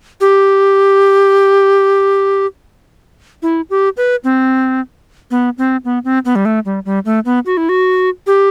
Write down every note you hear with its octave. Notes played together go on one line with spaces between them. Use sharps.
G4
E4
G4
B4
C4
B3
C4
B3
C4
B3
G3
A3
G3
G3
A3
B3
F#4
E4
F#4
G4